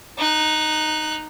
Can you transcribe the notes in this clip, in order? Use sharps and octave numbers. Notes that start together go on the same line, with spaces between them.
D#4 F#6